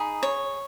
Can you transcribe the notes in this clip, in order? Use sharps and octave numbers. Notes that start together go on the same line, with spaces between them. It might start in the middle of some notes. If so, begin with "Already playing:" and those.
Already playing: D#4 G#4 B5
C#5